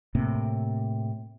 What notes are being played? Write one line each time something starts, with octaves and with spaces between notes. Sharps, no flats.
A2 C3 A#3